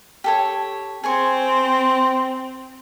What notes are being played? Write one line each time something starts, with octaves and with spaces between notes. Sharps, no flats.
G4 A4 C#5
C4 G#4 G#5 C#6